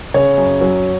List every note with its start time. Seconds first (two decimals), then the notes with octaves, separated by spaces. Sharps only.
0.14 C#3 C#5
0.38 F#2
0.61 F#3